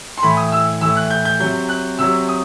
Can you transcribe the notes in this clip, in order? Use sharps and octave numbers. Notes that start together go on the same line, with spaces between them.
C6
A2 E3 B5
D#6
E6
A2 E3 E6
F#6
G6
G6
C3 F#3 G6
F#6
C3 F#3 E6
D#6